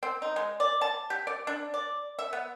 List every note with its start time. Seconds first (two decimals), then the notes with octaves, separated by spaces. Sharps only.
0.03 C4
0.22 D#4
0.36 G#3
0.60 D5
0.81 A5
1.10 G4
1.27 D5
1.47 D4
1.74 D5
2.19 E5
2.33 B3